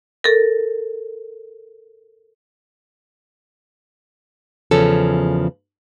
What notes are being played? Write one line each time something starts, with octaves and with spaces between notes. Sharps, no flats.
A4 A#4
E2 C#3 F3 C#4 A4